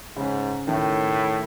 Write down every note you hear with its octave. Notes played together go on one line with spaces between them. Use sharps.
G#2 C#3
A2 D#3